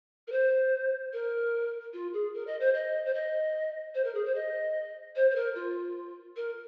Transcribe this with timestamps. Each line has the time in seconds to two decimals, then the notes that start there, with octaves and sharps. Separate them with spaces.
0.27 A#4
0.31 C5
1.13 A#4
1.93 F4
2.13 G#4
2.34 A#4
2.47 D#5
2.60 C5
2.74 D#5
3.05 C5
3.13 D#5
3.94 C5
4.04 A#4
4.14 G#4
4.25 C5
4.34 D#5
5.15 C5
5.30 C5
5.35 A#4
5.55 F4
6.36 A#4